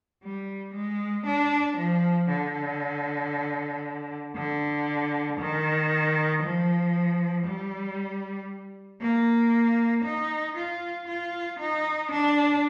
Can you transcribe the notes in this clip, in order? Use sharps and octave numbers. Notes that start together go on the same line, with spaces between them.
G3
G#3
D4
F3
D3
D3
D#3
F3
G3
A#3
D#4
F4
F4
D#4
D4